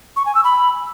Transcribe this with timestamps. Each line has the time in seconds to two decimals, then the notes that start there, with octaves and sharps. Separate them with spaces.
0.16 C#6
0.26 G#5
0.35 E6
0.44 B5